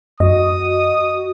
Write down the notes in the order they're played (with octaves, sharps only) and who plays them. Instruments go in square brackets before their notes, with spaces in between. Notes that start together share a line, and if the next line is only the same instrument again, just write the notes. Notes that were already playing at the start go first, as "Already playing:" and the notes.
[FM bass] F#2 [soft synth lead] F#4 [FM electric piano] D#5 [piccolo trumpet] D#6